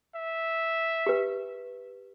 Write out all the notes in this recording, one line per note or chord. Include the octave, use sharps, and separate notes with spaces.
E5
G4 B4